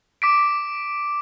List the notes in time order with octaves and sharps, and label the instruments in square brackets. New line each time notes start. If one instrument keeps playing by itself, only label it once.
[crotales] D6 B6 D7